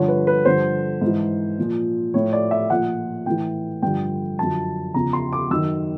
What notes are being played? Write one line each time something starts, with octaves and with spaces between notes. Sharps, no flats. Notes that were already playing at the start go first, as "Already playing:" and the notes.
Already playing: G2 D3 F3 C#5
B4
B4
G2 D3 F3 C5
G#2 E3
A#2 F3
A2 F3 C#5
D5
E5
A#2 F3 F#5
A2 E3 G5
G2 D3 F3 G5
F#2 D3 F3 A5
E2 C#3 F3 A#5
C6
D6
F#2 D#3 E6